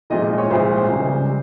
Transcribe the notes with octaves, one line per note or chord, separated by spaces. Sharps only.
C2 A#2 F3 G#3 D#5
D#5
C#5
C2 A#2 F3 G#3 C5
C#2 C#3 G3